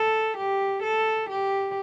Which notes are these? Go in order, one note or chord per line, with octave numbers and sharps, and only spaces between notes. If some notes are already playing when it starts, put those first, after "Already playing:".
Already playing: A4
G4
A4
G4